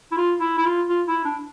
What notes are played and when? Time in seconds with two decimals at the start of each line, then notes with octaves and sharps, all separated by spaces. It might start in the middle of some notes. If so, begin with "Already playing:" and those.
0.12 E4
0.17 F4
0.40 E4
0.58 E4
0.65 F4
0.89 F4
1.08 E4
1.24 D4